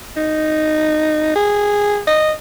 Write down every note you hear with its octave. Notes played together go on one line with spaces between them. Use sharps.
D#4
G#4
D#5